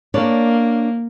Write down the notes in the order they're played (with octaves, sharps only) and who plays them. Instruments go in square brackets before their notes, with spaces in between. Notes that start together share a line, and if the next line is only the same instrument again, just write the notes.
[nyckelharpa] A#3 [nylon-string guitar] D4 C#5 D5